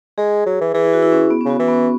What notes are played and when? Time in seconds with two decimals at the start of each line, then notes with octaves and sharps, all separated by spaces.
0.18 G#3 G#4
0.46 F#3
0.61 E3
0.74 E3 G#4
0.84 E4
0.93 F#4
1.03 E4
1.12 C#4
1.30 B3
1.41 C#4
1.45 C#3
1.50 F#4
1.59 E3 C#4
1.68 B3
1.73 C#4